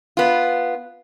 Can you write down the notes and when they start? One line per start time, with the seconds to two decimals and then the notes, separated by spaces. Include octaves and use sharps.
0.17 B3 F4